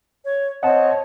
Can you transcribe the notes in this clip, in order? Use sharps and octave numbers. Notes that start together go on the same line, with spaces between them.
C#5
C4 C#5 D#5 F#5 A5